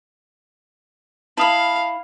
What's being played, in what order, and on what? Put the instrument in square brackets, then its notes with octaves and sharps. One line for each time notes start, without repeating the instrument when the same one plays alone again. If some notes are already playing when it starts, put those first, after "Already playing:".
[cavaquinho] E4 B5 [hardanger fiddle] F5 [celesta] A5 D#6